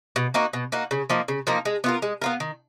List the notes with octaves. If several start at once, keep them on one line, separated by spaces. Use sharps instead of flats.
B2
A#3 D#4 F#4
B2
A#3 D#4 F#4
C#3
F3 A#3 D#4
C#3
F3 A#3 D#4
G#3
B3 F4 A#4
G#3
B3 F4 A#4
D#3